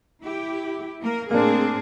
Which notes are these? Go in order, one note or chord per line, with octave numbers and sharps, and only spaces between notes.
E4 G4
A#3 A#4
A2 A#3 C4 D4 G#4